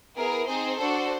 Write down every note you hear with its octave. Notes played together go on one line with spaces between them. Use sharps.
B3 E4 G#4 A#4
C4 D#4 G#4 C5
D4 F#4 A4